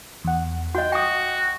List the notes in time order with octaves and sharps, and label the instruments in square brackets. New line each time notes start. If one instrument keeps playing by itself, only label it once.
[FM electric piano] E2 F#5
[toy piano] F#4 D#5 [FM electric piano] F#5 [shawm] G5
[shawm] F#4 [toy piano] G5 D#6